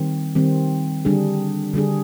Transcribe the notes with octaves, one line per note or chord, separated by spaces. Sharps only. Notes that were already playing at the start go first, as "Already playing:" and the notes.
Already playing: D#3 G3 C4
D#3 G3 C4
D3 G3 D4 G#4
D3 G3 D4 G#4